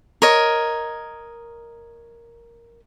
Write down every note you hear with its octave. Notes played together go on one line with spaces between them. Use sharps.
A#4 C#5 D#5